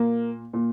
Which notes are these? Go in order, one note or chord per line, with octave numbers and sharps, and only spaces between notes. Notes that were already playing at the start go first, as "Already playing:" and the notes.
Already playing: A#2 A#3
A#2